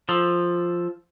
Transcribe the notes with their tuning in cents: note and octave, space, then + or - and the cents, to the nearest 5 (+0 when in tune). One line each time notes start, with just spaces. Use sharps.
F3 +0 A4 +0